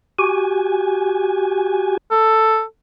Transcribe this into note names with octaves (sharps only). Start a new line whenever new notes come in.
F#4 G4 G#5
A4